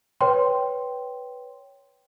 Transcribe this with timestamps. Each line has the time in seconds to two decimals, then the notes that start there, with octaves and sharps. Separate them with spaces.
0.21 B4 C#5 G5 C6